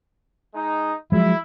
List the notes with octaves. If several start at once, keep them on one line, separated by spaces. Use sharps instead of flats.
G#3 D#4
F3 F#3 G#3 E4